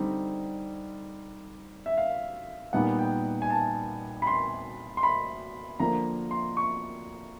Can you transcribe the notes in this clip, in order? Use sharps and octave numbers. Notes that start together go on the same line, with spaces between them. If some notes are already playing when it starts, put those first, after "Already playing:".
Already playing: D3 G3 C4 D#4
E5
F5
A#2 G3 B3 D#4 F#5
G5
G#5
A5
B5
C6
C6
B5
D3 F3 A#3 A#5
C6
C#6